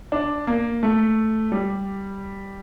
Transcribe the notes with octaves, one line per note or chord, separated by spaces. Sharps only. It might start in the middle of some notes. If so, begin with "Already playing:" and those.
D4
A#3
A3
G3